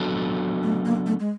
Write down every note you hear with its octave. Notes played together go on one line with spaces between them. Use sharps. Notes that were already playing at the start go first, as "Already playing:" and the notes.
Already playing: F#3 B3 D4 F#4 A4
A3
A#3
A3
G#3